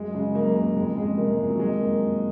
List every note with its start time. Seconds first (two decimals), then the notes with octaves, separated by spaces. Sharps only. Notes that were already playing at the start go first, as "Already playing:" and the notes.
Already playing: F#2 G#3
0.14 C#3 G#3
0.34 F#2 A#3
0.55 C#3 A#3
0.76 F2 G#3
0.97 F2 G#3
1.17 C3 A#3
1.28 G#3
1.38 F2 G#3
1.49 F#3
1.59 D#3 G#3
1.80 F#2 A#3
2.00 D#3